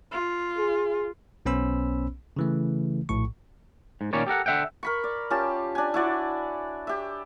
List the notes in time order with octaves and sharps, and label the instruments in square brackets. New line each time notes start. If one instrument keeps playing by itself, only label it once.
[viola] F4
[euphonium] G#4
[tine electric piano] B1 B3 C#4 C5 B5 E6
C#3 E3 A3
A#1 A2 C#6
[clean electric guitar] G#2
A#2 D#3 A#3 C#4 C#5 D5
G4 A4 A#4 F#5
D3 E5 F#5 G5
[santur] A#4 B5 C#6
D5
C#4 F4 G4 A5
D4 G#5
E4 F#4 D5
G4 E5